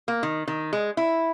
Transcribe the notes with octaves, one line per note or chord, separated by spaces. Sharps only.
A#3
D#3
D#3
G#3
E4